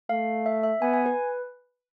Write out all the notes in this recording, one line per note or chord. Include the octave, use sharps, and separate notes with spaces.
A3 F5
E5
E5
B3 G#5
G#5
B4